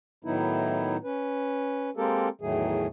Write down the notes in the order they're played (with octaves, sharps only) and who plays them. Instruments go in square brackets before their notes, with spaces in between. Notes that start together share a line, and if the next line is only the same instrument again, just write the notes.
[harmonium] A2 D#3 F#3 B3 D#4 E4
C#4 B4
G#3 A#3 C4 G4 A4 A#4
E2 A2 D#3 F#3 A3 G#4